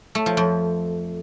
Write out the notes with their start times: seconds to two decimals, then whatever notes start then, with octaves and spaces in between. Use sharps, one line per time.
0.15 A3
0.26 F3
0.37 F2